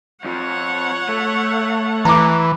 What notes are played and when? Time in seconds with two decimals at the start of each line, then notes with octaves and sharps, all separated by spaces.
0.25 F2 F3 C#5 F#5
1.09 A3
2.05 E3 A#5 D6